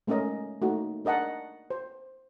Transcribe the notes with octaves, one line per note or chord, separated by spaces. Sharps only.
G#3 A3 C#4 A#4 D#5
A3 A#3 D#4 F#4
D4 A#4 D#5 F#5 A5
C5